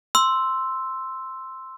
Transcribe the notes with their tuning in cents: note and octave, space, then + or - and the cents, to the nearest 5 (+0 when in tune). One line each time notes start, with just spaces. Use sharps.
C6 +0 E6 +0